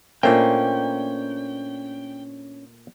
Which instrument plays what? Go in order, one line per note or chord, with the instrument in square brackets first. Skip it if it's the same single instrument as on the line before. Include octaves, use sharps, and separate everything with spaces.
[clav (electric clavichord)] A#2 A3 A#3 [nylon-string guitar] C#4 D4 C5 [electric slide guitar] G5